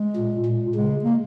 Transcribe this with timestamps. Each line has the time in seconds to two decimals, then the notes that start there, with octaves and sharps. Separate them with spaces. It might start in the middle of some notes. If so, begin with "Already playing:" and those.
Already playing: G#3
0.16 A#2
0.45 A#2
0.75 C#3 G#3
1.04 A#3